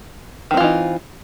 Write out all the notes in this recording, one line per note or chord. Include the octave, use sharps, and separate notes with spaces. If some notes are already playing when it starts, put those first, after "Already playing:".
D#3 E3 C4 D#4 F4